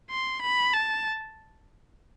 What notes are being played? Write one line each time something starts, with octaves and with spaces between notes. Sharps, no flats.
C6
B5
A5